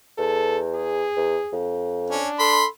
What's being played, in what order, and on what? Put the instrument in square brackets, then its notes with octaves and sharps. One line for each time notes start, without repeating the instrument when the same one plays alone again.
[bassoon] E2 [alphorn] A4
[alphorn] G#4
[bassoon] E2
F2
[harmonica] C#4 [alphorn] D4
[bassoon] A4 [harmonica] B5 C6